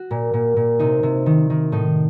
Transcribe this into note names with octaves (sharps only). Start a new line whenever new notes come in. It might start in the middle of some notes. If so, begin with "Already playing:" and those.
Already playing: F#4
A#2
A#2
A#2
C3 D#4
C3
D#3
D#3
A2 D#4